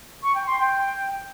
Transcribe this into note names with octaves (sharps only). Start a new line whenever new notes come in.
C#6
G5
C6
G5